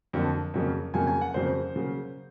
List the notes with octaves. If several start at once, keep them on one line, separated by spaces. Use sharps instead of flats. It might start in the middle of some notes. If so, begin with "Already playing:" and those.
F2 D3 F#3 A#3
F2 C#3 F#3 A#3
F2 C#3 F#3 A#3 G#5
G#5
F#5
F2 C#3 F#3 A#3 C5
C#3 F#3 A#3